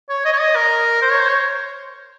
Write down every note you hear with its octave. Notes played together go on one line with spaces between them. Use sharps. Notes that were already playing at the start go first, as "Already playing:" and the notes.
C#5
D#5
C#5
D#5
A#4
C5
C#5
C5
C#5